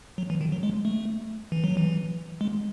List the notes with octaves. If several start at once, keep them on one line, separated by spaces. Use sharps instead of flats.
F#3
E3
D#3
F#3
G#3
A3
E3
F#3
E3
G#3